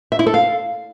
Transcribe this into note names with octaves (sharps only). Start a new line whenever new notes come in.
E5
E4
A4
F5